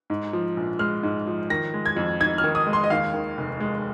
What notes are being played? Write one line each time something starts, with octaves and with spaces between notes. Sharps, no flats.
G#2
F3
A#1
G#3 F6
G#2
F3
D#3 A#6
G#3
G#6
F2
D#4 G#6
F6
D#3
D#6
G#3
C6
D#5
D#2 F5
D#3
F1
G#3